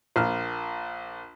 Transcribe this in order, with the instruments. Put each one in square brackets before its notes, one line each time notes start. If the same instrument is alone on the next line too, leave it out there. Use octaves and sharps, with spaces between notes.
[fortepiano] A#1 F6